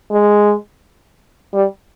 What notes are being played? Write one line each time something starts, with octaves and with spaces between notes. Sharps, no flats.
G#3
G3